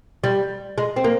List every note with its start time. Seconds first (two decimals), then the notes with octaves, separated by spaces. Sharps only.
0.24 G3
0.78 G#3
0.96 C4
1.04 A#3